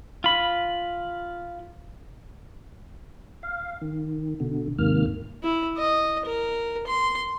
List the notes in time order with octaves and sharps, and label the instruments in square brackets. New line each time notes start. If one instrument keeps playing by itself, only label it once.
[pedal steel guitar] F4 B5
[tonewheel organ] F5
D#3
B2 D3
D#2 G#2 C3 D#3 A#3 F6
[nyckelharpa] E4
D#5
A#4
C6